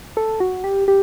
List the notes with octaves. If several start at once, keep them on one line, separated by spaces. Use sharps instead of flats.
A4
F#4
G4
G4